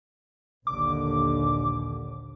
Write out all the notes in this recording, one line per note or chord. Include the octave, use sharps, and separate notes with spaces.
A#1 D#2 D3 D6